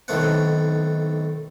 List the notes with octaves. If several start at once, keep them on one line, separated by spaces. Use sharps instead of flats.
B1 A2 D#3 A3 C4 F#5